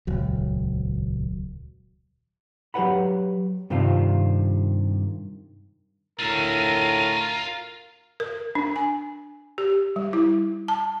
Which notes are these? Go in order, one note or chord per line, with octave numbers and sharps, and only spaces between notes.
D#1 C#2 F#3
F#3 G4 A#4 B4 F#5 B5
G2 C3 D#3 C4 F4
D2 A2 F4 A#4 E5 D#7
A#4
D4
G#5
G4
G3
E4
A5